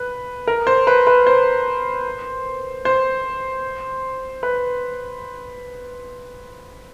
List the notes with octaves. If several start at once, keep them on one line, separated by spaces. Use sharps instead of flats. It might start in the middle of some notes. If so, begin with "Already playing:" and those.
Already playing: B4
A#4
C5
B4
B4
C5
C5
B4